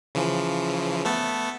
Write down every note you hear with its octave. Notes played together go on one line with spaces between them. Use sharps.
C#3 E3 F3
A3 B3 A4